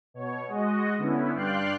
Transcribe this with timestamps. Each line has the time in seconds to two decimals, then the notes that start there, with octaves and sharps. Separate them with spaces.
0.14 B2 C#5
0.48 G#3 F#4 D#5
0.98 D3 B3 C#4 E4
1.34 G2 D5 F5 G5 C6 F#6